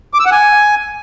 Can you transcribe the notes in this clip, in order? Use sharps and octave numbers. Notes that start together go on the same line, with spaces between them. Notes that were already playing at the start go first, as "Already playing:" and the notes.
D6
E6
F#5
G#5